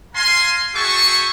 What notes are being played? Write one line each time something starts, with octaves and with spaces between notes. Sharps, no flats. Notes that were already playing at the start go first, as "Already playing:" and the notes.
F5 G#5 A#5 C6
F#4 G#4 E5 G5 A5 C#6